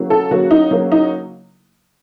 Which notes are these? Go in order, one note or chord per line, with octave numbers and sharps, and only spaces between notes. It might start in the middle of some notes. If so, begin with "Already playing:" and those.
Already playing: C#3 F#3 A#3
A4
C#3 F#3 A#3 F#4
D#4
C#3 F#3 A#3
D#4